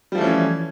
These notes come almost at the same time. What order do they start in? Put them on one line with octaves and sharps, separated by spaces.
G3 F3 A3 E3 C#4